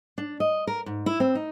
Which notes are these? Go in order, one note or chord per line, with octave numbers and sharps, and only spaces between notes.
D4
D#5
A#4
G#2
E4
C4
D#4